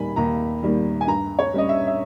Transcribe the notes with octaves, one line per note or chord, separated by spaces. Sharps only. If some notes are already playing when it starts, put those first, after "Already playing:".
Already playing: D#2 D#3 G3 A#3 G#5 B5
D#2 A#5
D#3 G3 A#3
G#5
G2 A#5
C#5
G3 C#4 D#5
E5
E5